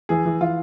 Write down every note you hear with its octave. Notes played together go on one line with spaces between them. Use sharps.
E3 G#4
E3
E3 F4